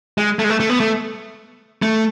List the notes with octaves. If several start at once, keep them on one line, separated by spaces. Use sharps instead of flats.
G#3
A3
G#3
A3
A3
B3
A3
A3